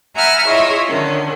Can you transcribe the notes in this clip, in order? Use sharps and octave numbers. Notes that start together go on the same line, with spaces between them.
E5 F#5 G#5 A#5 B5 F6
E4 F4 G#4 C#5 D#5 E5
D3 D#3 C#4